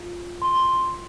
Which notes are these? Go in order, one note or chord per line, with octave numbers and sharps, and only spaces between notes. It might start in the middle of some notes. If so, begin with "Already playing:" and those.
Already playing: F4
C6